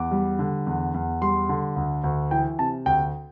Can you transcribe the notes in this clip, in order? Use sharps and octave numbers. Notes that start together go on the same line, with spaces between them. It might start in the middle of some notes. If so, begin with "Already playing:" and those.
Already playing: E2 D6
G3
D3
E2
E2
G3 C6
D3
D2
D2
E3 G5
C3 A5
D2 G5